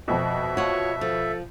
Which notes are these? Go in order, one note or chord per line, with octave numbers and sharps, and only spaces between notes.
F2 B2 E5
F4 F#4 C#5
F3 A4